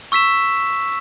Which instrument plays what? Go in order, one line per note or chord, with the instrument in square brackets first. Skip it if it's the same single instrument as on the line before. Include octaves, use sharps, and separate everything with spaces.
[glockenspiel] C#6 E6 B6 E7